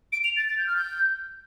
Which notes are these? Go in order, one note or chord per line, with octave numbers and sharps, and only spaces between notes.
D7
F7
A6
A6
G6
F6
G6